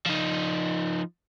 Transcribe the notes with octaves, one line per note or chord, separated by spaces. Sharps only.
F3 D#4